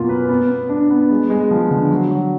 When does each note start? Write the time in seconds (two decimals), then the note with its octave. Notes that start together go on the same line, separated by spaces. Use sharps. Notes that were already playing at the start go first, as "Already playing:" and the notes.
Already playing: F#2 B2 A#3 F4
0.09 B4
0.29 B3
0.50 B3
0.69 D4
0.90 B3
1.10 G#3
1.30 G#3
1.51 F3
1.71 D3
1.91 F#3
2.11 F#3